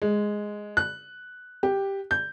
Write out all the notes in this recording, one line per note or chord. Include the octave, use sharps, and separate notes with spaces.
G#3
F#6
G4
G6